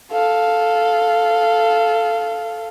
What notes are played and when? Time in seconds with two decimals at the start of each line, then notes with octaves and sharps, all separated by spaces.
0.12 A4 F5